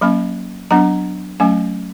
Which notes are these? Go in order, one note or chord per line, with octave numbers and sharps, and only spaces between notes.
F#3 A#3 C#4 B5
F#3 B3 D4 A#5
F#3 A3 C#4 G#5